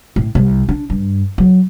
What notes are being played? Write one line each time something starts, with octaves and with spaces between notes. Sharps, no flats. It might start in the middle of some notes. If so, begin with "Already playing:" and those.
A2
C2
D4
G2
F#3